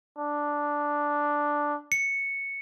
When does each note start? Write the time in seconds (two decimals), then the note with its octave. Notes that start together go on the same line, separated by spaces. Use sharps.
0.18 D4
1.92 C#7